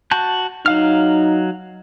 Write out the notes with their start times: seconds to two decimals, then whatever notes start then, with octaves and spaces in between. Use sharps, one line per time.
0.11 F#4 A5 G6
0.66 F#3 D#4 F5 F6